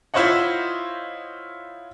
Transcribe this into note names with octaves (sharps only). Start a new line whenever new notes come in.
E4 F4 C5 C#5 D#5 F#5